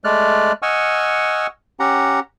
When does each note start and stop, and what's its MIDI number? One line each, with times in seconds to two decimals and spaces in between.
0.04 0.52 56
0.04 0.52 57
0.04 0.52 74
0.04 0.52 89
0.04 0.52 90
0.62 1.47 75
0.62 1.47 78
0.62 1.47 80
0.62 1.47 85
0.62 1.47 88
0.62 1.47 89
1.80 2.20 61
1.80 2.20 67
1.80 2.20 78
1.80 2.20 82